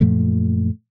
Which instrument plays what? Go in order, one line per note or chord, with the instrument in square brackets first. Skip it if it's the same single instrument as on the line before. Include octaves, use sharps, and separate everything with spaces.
[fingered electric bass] F#2 A#2 F3 A3